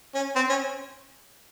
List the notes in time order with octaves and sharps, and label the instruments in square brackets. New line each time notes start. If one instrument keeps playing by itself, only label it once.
[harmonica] C#4
C4
C#4